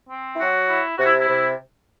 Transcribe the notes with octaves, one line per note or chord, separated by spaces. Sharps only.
C4
E4
F#3 F#4
E4
C3 F#4
E4
E4
C3